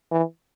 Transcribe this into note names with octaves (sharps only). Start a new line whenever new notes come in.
E3